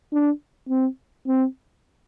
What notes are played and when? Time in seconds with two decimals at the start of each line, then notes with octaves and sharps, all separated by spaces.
0.13 D4
0.69 C4
1.28 C4